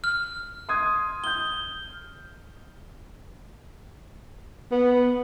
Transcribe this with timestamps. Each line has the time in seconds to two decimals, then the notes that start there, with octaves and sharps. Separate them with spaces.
0.04 F6
0.69 C6 D#6 G#6
1.24 D#6 G6 G7
4.72 B3